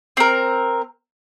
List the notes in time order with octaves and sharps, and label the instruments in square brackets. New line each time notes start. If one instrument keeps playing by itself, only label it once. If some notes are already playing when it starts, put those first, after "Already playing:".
[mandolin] C4 A#4